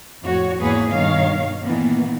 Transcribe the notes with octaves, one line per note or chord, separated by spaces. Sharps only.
F2 A2 F#4 C#5
E2 G#2 A#3 G#4 B4 C#5
G2 B2 D#3 C#5 F5
A#2 D#3 E3 A#3 B3